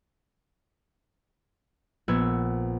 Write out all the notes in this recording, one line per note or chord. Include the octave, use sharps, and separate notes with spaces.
A#1 B3 E6 G#6